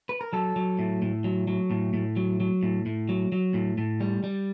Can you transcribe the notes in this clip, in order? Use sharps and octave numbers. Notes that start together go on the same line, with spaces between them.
B4
A#4
F#3 A4
F#3
A2
A2
F#3
F#3
A2
A2
F#3
F#3
A2
A2
F#3
F#3
A2
A2
G3
G3